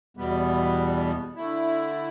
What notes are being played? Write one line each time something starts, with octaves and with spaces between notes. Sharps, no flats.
E2 B2 G3 B3
D3 A3 E4